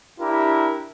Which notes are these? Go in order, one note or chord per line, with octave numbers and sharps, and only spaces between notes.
D4 E4 G4 A#4